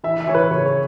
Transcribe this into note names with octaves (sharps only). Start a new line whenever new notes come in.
E3 E5
E5
E3 C#5
B4
C#3 C#5
C#5